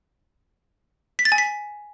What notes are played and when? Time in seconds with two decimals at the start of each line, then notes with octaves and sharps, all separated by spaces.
1.19 B6
1.25 A6
1.32 G#5
1.38 B6